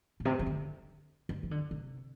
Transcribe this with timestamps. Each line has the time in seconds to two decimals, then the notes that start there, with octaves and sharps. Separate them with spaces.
0.20 A2
0.25 C3
0.39 E3
0.47 D3
1.29 D3
1.43 E3
1.51 D3
1.71 C3